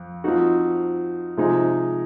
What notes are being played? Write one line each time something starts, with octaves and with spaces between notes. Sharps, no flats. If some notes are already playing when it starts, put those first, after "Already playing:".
Already playing: F2
F3 C4 D#4 F#4
C3 F3 G#3 D#4